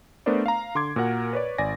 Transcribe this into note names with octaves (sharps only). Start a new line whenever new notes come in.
A3 B3 D4 A#4 C5 D5
F5 A#5
D3 C6 D6 G#6
A#2 F#4 A#4 F#5
B4 C#5 D5
G#1 D5 G#5 A#6